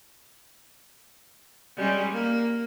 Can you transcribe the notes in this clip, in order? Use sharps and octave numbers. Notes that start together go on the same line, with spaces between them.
G3 G#3 C#4
A#3